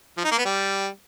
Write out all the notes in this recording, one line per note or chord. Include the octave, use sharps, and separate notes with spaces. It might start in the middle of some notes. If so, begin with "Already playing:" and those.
F3
D#4
A#3
B3
G3